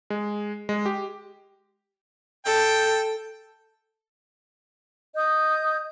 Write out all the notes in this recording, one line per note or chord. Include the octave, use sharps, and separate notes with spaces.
G#3
G#3
G4
A4 G5
D#5 D#6 G6